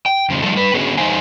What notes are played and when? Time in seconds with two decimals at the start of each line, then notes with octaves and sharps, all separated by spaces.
0.06 G5
0.29 F2 C#3 F3
0.42 D3 F3 G3 A3 F4 A4
0.56 G3 B4
0.74 D3 B3 C#4 F#4 G#4
0.97 E2 G3 D#4 C5 F5 G#5